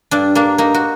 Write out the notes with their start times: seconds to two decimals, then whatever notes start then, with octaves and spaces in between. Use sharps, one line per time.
0.11 G2 D4
0.35 A#3 D4
0.58 A#3 D#4
0.74 F#4